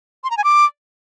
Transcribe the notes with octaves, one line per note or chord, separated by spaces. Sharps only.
C6
A#5
G#5
D6